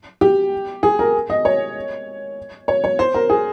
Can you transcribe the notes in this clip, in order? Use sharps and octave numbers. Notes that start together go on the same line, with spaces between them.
G4
G#4
A#4
D#5
C#5
C#5
C#5
C5
A#4
G#4